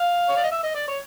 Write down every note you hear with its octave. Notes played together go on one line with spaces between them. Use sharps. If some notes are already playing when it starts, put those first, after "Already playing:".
Already playing: F5
C#5
D5
D#5
E5
D#5
D5
C#5